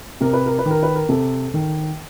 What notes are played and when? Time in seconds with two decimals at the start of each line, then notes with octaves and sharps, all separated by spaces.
0.21 C3 A#4
0.33 B4
0.46 A#4
0.58 B4
0.66 D#3 A#4
0.83 B4
0.95 A#4
1.09 C3 A4
1.54 D#3